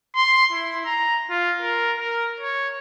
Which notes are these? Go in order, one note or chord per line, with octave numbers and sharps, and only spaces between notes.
C6
E4
A#5
F4
A#4
A#4
C#5